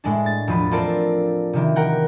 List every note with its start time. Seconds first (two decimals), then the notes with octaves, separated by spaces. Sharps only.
0.04 A2 G#3 D4
0.26 A6
0.47 E1 F3 B5
0.71 C4 D4 F4 A4 A#4 D5
1.53 C3 D#3 E3
1.76 A#4 F#5 G5